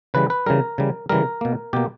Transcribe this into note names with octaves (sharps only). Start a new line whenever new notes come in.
C#3 E3 G3 B4
B4
C#3 E3 G3 A#4
C#3 E3 G3
C#3 E3 G3 A#4
B2 A#3
B2 A#3 G4